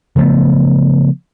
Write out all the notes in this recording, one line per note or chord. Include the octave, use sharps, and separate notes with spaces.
C#3 F3 A3 B3